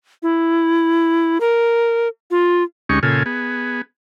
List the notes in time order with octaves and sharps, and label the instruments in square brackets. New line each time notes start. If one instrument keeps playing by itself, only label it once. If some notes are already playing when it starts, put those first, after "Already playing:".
[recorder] E4
A#4
F4
[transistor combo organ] D2 G#3 C#4 D#4 G4 C#6
A#2 C#3 F4 A4 G#5
B3 G#4